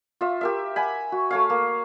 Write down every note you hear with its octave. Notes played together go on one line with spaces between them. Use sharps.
F4 E5
G4 A#4 E5
F#5 G#5 B5
F#4
A3 C#5 F5
A#3